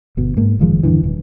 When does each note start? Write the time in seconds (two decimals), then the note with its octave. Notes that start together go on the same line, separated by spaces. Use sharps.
0.17 G1 B2
0.37 G#2 A#3
0.59 F#1 D#3 F3 G#3
0.83 E2 G2 D3 E3
1.04 D#1